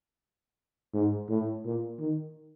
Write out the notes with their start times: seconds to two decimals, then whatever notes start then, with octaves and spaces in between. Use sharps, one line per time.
0.94 G#2
1.29 A2
1.65 A#2
2.00 D#3